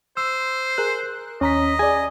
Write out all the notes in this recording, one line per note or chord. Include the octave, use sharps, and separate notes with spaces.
C5 E6
G#4 A#4 F#6
D#2 C#4 D#5 A#5 B6
G#4 D5 G#5